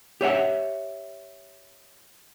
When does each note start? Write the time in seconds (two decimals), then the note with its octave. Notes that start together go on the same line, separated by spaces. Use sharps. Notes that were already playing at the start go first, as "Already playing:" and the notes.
0.21 G4 C#5 E5 F#5